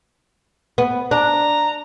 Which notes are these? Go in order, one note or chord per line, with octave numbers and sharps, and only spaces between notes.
B3
D4 A#5